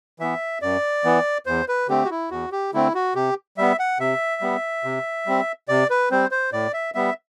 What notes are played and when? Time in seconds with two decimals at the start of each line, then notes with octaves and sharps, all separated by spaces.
0.20 E3 B3 E5
0.62 F#2 D5
1.04 E3 B3
1.46 E2 C5
1.68 B4
1.88 D3 A3 C4 G4
2.05 F#4
2.11 E4
2.30 E2 F#4
2.52 G4
2.74 D3 A3 C4 E4
2.95 F#4
3.15 C3 G4
3.57 G3 B3 E5
3.79 F#5
3.99 C3 E5
4.42 G3 B3
4.84 C3
5.26 G3 C4
5.68 C3 D5
5.90 B4
6.11 G3 C4 C5
6.31 C5
6.52 A2 D5
6.73 E5
6.95 G3 B3 E5